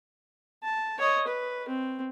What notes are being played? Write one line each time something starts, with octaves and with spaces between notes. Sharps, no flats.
A5
C#5 D#5
B4
C4